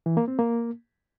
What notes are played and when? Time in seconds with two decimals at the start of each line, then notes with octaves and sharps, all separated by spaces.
0.06 E3
0.17 A#3
0.28 C4
0.39 A#3